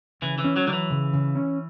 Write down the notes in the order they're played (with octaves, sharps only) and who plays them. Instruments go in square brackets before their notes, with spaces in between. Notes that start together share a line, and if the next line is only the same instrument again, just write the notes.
[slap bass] C#3 [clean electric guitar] E3
[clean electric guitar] E3
[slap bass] C#4
[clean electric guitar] F#3
[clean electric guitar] D3 [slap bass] F#3
[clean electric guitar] E3
[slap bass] C#3
C#3
C#4